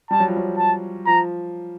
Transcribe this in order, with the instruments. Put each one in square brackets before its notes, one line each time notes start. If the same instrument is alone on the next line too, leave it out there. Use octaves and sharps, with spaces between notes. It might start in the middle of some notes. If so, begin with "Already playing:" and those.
[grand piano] G3 [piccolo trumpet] A5
[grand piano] F#3
F3
F#3
[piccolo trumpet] A5
[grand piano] F3 [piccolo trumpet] A#5